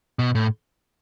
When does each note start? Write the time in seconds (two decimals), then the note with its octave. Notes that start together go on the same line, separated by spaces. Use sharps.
0.19 B2
0.35 A2